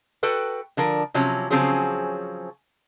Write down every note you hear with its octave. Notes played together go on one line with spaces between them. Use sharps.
F#4 A4 B4 G5
D3 F3 A#4
C3 F3 F#3 C#4
C#3 F3 F#3 C4 C#4 G#4